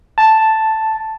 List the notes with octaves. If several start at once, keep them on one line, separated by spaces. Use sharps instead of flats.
A5